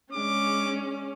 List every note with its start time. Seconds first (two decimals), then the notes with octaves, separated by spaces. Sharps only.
0.13 G#3 C#4 D4 D6